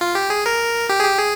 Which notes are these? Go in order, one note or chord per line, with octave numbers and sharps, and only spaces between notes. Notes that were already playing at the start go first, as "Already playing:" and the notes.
F4
G4
G#4
A#4
G4
G#4
G4
G#4